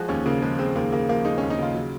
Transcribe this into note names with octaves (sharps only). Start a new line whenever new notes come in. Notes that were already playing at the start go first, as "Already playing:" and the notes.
Already playing: F3 G#3 F#4 G#4
D#2 C#4
C#3 A#3
F3 G#3
G#3 C4
D#2 A#3
C#3 A#3
F3 A#3
G#3 D#4
D#2 C#4
D#4
C#3 F4
F#3